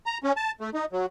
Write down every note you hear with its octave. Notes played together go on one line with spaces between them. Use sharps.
A#5
C#4
A5
A3
D#4
F#3